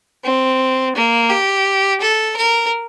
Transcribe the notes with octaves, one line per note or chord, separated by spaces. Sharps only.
C4
A#3
G4
A4
A#4